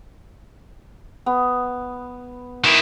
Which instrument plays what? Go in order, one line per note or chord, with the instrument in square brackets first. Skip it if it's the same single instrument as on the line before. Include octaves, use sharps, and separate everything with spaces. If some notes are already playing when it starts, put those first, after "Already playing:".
[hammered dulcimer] B3
[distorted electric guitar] D#3 E4